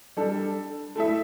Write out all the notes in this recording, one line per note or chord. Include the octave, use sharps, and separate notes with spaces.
G3 D4 A4
A3 E4 A4 E5